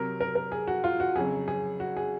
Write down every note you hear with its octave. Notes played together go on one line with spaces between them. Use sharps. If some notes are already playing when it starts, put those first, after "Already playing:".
Already playing: C3 F#3 A#4
A#4
A#4
G#4
F#4
F4
F#4
F2 C#3 F#3 G#4
G#4
F#4
G#4